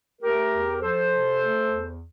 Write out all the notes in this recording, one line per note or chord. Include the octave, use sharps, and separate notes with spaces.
A3 G4 A#4
E2
F3 A4 C5
C3
A3
E2